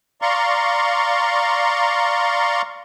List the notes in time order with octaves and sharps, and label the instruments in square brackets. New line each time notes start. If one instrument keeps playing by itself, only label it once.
[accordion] D5 F5 A#5 C6 C#6